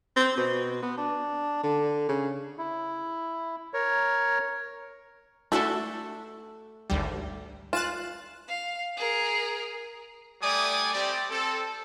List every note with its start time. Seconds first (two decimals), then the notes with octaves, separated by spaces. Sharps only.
0.16 C4
0.37 B2
0.82 B3
0.98 D4
1.64 D3
2.09 C#3
2.58 E4
3.74 A#4 C#5
5.52 A3 D4 E4 F#4 A4
6.90 G#1 D2 G3
7.73 F4 F#6 A6 E7
8.48 F5
8.96 G#4 A#4
10.42 G3 A3 D5 G#5 D#6
10.93 G3 C4 G4 D5
11.30 C4 A4